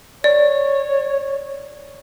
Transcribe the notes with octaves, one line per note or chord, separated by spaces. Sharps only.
C#5 D5